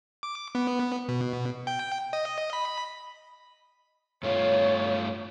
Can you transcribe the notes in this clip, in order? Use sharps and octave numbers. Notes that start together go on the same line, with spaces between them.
D6
B3
B2
G5
D#5
B5
G2 A3 F4 C#5